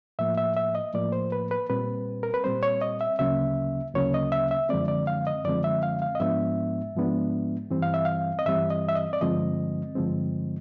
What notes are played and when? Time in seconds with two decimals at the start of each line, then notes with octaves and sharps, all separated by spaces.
0.19 A2 F3 A#3 E5
0.38 E5
0.57 E5
0.75 D#5
0.94 A2 F3 A#3 D5
1.12 C5
1.32 B4
1.51 B4
1.69 A#2 G3 C4 B4
2.23 A#4
2.34 B4
2.44 A#2 G3 C4 C5
2.63 C#5
2.81 D#5
3.01 E5
3.19 D2 C#3 F#3 A#3 C#4 E5
3.94 D2 C#3 F#3 A#3 C#4 C#5
4.14 D#5
4.32 E5
4.51 E5
4.69 F#2 D3 F3 G#3 C4 D5
4.88 D5
5.07 F5
5.27 D#5
5.44 F#2 D3 F3 G#3 C4 D5
5.64 E5
5.83 F5
6.02 F5
6.15 D#5
6.20 G#2 F3 G#3 B3 D4 E5
6.95 G#2 F3 G#3 B3 D4
7.70 G2 E3 G3 C4
7.82 F5
7.94 E5
8.05 F5
8.39 D#5
8.46 G2 E3 G3 C4 E5
8.71 D#5
8.89 E5
8.95 D#5
9.13 D5
9.21 G2 D3 F3 G#3 C4 D#5
9.95 G2 D3 F3 G#3 C4